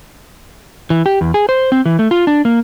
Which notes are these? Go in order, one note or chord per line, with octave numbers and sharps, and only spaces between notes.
E3
G4
E2
G#4
C5
C4
E3
A3
F4
D4
A#3